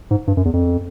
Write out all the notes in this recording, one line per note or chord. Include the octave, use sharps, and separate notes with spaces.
G#2
G2
F#2
E2
F2